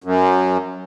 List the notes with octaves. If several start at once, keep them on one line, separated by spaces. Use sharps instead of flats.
F#2